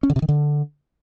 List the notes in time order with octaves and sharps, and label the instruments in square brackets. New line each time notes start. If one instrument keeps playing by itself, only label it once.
[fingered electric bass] C#4
D3
C3
D#3
D3